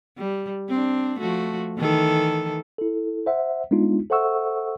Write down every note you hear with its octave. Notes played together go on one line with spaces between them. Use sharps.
G3
C4 D4
F3 A3 F#4
D#3 E3 A4
E4 A4
C5 E5 F#5
G#3 B3 D4 D#4 F4
A4 C5 E5 F#5 C#6 E6